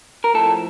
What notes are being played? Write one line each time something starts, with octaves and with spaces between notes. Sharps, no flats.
A#4
A2 F3 A4